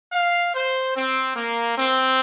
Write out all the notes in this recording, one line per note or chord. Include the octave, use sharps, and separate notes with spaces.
F5
C5
C4
A#3
C4